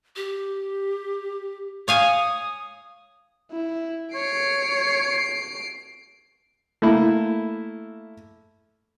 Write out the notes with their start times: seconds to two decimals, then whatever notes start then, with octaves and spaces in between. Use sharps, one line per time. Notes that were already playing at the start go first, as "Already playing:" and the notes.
0.16 G4
1.88 C#5 F5 G#5 D#6
3.51 E4
4.15 C#5 C7 D7
6.82 A3 A#3 E4